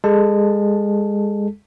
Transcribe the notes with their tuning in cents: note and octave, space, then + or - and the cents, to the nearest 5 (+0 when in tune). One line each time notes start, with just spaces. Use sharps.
G#3 -25 A4 -15 A5 +0